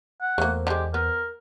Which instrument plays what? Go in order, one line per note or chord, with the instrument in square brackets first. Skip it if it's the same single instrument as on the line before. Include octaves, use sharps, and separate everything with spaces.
[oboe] F#5
[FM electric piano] E2 C5 [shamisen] A3 A#3
[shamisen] D3 G#3 [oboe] G4
[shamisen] B3 [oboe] A#4